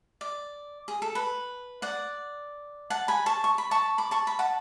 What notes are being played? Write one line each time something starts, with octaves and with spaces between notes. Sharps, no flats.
D5
G#4
A4
B4
D5 F#5
F#5 A5
G#5 B5
A5 C#6
C#6
B5
A5 C#6
B5 D6
A5 C#6
B5
F#5 A5